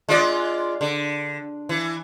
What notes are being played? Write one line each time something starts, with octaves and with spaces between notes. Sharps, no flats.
G#3 F4 D5
D3
E3